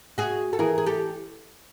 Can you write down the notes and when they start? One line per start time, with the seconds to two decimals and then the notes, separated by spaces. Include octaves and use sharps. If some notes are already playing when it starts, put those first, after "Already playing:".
0.18 F#4 G#4
0.53 A4
0.59 E3 G#4 A#4
0.78 G#4
0.86 G4 A4